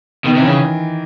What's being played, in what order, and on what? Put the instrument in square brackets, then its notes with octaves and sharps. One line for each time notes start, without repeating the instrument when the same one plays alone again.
[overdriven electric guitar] B2 [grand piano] D#3
[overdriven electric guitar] C3
[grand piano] E3
[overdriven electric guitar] C#3